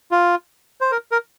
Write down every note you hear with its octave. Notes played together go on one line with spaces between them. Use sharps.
F4
C5
A#4
A#4